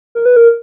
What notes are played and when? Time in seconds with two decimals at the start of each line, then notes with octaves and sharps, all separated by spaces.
0.15 A#4
0.26 B4
0.36 A#4